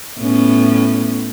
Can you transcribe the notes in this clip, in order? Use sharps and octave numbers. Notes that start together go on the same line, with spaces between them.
A2 B3 C#4